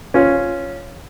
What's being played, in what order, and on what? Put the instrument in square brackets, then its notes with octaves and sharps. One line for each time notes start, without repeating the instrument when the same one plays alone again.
[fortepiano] C#4 F4